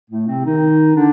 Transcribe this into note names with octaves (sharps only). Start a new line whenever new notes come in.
A2 A3
C3 C4
D#3 D#4
D3 D4